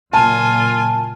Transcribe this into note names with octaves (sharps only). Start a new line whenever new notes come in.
F#1 A#2 F4 G#5 A5